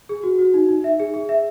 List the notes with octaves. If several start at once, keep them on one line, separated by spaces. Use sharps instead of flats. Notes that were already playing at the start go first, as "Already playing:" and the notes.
G#4
F#4
F#4
D#4
D#4
E5
G#4
G#4
E5